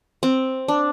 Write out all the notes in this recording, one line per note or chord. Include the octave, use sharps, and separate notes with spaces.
C4
D4